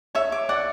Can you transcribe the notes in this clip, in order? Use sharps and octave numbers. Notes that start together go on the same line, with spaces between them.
C#5 E5
D6
D5 F#5